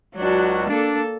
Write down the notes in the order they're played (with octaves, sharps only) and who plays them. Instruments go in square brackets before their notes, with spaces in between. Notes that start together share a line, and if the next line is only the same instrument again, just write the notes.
[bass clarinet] C#2 [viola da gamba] F#3 D4 F#4
[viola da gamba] A#3 A4 [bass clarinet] D4